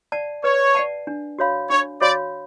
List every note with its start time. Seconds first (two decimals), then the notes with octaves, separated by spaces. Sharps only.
0.12 D5 F#5 A5
0.43 B4 C#5
0.75 D5 F#5 A5
1.07 D4
1.39 F#4 C#5 F5 B5
1.69 D4 C#5
2.01 F#4 C#5 D5 F5 B5